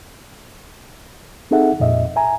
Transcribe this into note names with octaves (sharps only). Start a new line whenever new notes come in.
C4 D#4 G#4 A4 E5 F#5
F2 A#2 D#5 E5
E5 G#5 A#5